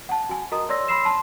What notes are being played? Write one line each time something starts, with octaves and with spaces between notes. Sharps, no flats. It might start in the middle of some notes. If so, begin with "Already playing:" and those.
F#5 A5
F#4 G#5
F#4 A#4 D#5 A#5 D#6
C#5 D5 C6 E6 A#6
B5 C6 E6 C7 E7
A5 C6